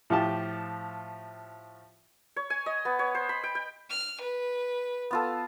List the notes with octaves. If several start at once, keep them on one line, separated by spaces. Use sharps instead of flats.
A2 F3 G4 A5
C#5
G#5
D#5
B3
C#5
C5
B5
G5
G5
F6
B4
B3 F4 A4